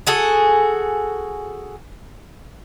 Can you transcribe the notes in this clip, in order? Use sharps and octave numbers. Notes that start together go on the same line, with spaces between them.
F#4 G#4 A4